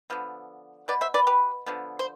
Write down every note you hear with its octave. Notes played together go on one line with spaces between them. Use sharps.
D3 F3 B3
B2 B3 B4 D5
C5 E5
B4 D5
G4 B4
D3 F3 B3
C5